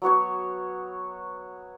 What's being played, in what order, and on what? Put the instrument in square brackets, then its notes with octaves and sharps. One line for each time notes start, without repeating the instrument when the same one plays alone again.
[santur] F#3 B3 F#4 C#5